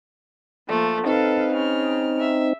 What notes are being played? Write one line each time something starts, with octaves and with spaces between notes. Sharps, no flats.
F3 A3 A#3
C4 D#4 A4 B4 F5
C#3 F6
E5